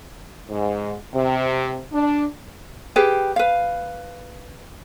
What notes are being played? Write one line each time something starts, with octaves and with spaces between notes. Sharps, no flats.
G#2
C3
D4
G4 G#4 B4 G5
B4 F5